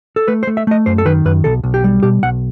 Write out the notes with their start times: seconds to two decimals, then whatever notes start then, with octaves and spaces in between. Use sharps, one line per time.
0.16 A4
0.28 A3 B4
0.43 C5
0.47 A3
0.57 E5
0.67 A3 D#5
0.86 F#2 C5
0.98 A4
1.06 D#3 B4
1.25 F#2 B4
1.44 B1 A4
1.64 B1
1.74 G4
1.84 G3
2.03 B2 G4
2.23 B1 F#5